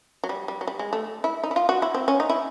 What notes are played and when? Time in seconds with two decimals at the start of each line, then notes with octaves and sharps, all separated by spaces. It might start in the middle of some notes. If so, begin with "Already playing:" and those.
0.24 F#3
0.29 G3
0.48 G3
0.61 F#3
0.67 G3
0.79 G#3
0.93 A3
1.24 E4
1.44 D#4
1.51 E4
1.56 F4
1.69 F#4
1.82 E4
1.94 C4
2.08 C#4
2.20 D#4
2.30 E4